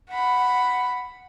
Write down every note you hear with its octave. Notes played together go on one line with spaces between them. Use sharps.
F#5 B5